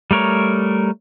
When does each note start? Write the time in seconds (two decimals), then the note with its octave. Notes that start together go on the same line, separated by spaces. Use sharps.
0.11 G3 A3 A#4 C#5